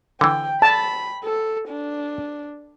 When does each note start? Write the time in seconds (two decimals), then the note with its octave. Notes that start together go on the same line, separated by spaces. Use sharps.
0.21 D3 E3 G5
0.62 A5 B5
1.24 A4
1.69 D4